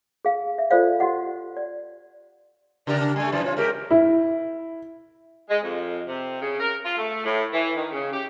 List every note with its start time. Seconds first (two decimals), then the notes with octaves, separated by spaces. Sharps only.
0.25 G#4 F5
0.58 E5
0.71 F4 A4 C5 D5 F5
1.00 F#4 G4 D#5 F#5
1.57 D5
2.87 C#3 G4 A#4 D5
3.00 D4
3.16 G3 A3 G#5
3.32 F#2 E3 F3 D5
3.44 C3 F4 F#4 C#5
3.57 G#3 G4 A#4
3.91 E4
5.49 G#3
5.63 F2
6.06 C3
6.40 C#3
6.60 A#4
6.84 F4
6.98 A3
7.25 A2
7.53 E3
7.76 D#3
7.92 C#3
8.13 G4